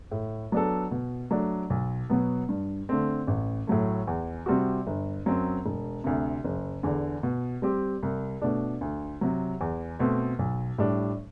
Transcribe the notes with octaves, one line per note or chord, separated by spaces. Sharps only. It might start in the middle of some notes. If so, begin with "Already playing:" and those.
A2
F#3 B3 D4 A4
B2
F#3 A3 D4
B1
B2 F#3 B3
G2
D3 A3 C4
A1
A2 F#3 A3
E2
C3 G3 C4 F#4
G1
F#2 F#3 C4
E1
D2 C3
F#1
E2 D3
B2
G3 C4 G4
C2
B2 A3 D4
D2
C3 F#3
E2
B2 A3 C4
B1
A2 G3 D4